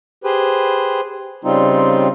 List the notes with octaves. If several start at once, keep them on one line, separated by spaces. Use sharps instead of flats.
G4 G#4 B4 C5
C#3 G3 C4 D#4 F4